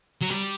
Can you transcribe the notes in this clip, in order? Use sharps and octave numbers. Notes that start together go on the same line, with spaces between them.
F#3
G3